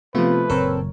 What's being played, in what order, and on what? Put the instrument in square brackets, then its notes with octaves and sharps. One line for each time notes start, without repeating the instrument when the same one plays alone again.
[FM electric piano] C3 B3 F4 [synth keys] F3 A3 [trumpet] B4
[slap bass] F#1 A#2 [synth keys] C4 A4 [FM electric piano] A#4 C#5